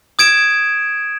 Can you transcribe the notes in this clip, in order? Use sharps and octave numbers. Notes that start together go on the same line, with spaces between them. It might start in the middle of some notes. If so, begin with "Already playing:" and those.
D#6 G#6 D7 E7